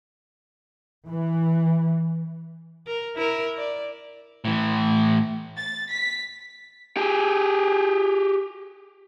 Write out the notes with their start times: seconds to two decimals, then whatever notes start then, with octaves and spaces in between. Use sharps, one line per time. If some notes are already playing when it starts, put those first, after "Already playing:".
1.07 E3
2.87 A#4
3.16 E4 A#4
3.57 D5
4.45 A2 E3
5.56 A6
5.92 B6
6.97 G4 G#4